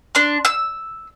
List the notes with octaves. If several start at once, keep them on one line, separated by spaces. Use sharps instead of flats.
D4 C6
E6